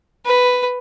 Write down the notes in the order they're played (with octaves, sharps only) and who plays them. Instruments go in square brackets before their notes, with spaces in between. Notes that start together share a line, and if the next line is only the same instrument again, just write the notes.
[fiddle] B4